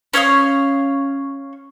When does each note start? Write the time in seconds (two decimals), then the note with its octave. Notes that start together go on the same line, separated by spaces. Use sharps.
0.14 C#4 C#5 F5 D#6